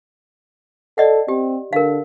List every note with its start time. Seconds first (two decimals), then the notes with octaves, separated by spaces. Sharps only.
0.98 A4 D5 D#5 F#5
1.28 C4 G4
1.73 D3 A#4 F5